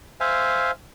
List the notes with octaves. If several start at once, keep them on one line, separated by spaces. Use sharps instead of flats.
C5 E5 F5 G#5